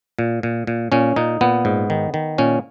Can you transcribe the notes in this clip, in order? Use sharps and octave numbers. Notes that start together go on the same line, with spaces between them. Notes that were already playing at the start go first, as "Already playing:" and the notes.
A#2
A#2
A#2
A#2 C#4
A#2 D#4
A#2 B3
G#2
D#3
D#3
A#2 C#4